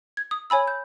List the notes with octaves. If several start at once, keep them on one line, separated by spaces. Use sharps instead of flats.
G#6
D#6
C#5 G#5 B5 E6
G6